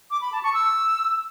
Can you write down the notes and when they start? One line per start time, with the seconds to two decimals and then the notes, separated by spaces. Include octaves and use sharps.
0.11 D6
0.22 B5
0.32 A5
0.43 C#6
0.54 E6